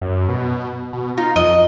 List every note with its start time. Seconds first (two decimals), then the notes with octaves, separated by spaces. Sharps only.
0.01 F#2
0.29 B2
0.93 B2
1.18 D#4 F4
1.36 F2 D#5